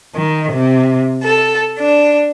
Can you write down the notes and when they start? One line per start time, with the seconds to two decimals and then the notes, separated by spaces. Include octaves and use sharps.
0.15 D#3
0.52 C3
1.22 A4
1.80 D4